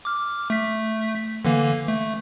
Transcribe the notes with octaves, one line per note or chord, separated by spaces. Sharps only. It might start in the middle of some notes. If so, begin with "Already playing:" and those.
D6 F6
A3 B6
D3 E3 A#3
A3